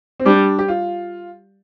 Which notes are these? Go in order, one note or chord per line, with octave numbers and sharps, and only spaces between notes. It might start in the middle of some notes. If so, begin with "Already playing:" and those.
C4
G3 D4
G4
F4